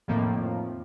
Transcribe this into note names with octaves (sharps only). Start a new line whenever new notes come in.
F2 A2 D#3 F3 A#3 C4